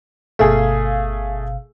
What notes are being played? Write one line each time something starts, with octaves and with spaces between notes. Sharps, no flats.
G1 B2 A3 G#4 F5